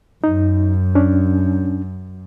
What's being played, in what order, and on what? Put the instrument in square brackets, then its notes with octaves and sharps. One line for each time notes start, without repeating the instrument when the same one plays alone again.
[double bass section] F#2 [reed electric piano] D#4
[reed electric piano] C#4 D4